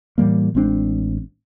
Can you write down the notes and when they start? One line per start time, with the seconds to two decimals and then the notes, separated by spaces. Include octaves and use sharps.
0.18 A2 E3 G3 A#3
0.55 A1 G#3 C4 D4